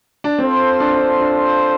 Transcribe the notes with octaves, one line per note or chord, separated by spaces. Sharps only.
D4
C4 F4 A4 C5
D4
D4
D4